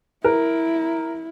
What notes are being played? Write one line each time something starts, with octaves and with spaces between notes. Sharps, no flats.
E4 A#4